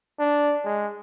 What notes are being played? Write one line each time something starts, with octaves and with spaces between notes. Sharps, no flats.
D4
G#3